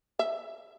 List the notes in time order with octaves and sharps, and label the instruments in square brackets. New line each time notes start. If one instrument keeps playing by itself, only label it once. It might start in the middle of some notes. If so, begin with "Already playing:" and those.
[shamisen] E5